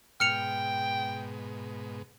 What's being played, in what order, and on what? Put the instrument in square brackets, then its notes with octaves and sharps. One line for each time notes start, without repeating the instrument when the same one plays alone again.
[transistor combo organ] G#2 B2 [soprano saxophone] G5 [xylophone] F6 C#7 F7